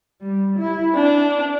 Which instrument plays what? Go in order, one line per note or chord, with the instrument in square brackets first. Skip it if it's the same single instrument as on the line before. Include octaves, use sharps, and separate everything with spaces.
[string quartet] G3
E4
D4